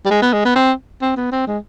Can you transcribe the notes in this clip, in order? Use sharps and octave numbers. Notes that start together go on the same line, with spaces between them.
G3
G#3
B3
G#3
B3
C4
C4
B3
C4
G#3